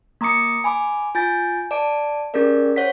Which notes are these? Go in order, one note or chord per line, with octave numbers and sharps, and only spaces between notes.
A#3 A#5 D6 D#6 C#7
G#5 B5 D6
F4 G#5 G6 A6
D5 A5 D6 D7
C#4 G4 G#4 A#4 D5
C5 C#5 F#5 B6